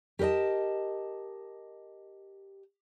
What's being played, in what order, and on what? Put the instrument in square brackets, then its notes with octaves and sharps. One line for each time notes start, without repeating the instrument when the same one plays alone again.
[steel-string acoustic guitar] G4 A#4 B4 D#5 A5